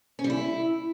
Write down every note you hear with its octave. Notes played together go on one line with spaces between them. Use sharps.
C#4
G3
E4